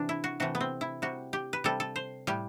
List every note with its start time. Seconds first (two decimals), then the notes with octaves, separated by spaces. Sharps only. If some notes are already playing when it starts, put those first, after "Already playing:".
Already playing: C3 E3 D4
0.09 E4
0.24 F#4
0.40 C3 E3 A3 F#4
0.55 B3
0.61 C4
0.81 E4
1.02 C3 G3 F#4
1.33 G4
1.53 B4
1.64 C3 G3 A4
1.80 A4
1.96 C5
2.27 A2 G3 G4